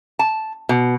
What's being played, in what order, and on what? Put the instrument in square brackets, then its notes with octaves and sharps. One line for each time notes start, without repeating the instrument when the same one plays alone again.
[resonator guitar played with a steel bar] A5
B2